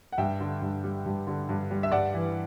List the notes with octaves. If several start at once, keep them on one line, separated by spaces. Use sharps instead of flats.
F#5
G2 E5 G5
D3
G2
G3
G2
D3
G2
G3
E5
G2 D5 F#5
E3